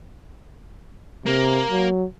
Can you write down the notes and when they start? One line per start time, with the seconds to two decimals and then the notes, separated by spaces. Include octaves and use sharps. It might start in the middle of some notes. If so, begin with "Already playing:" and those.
1.26 C3 A#3
1.71 F#3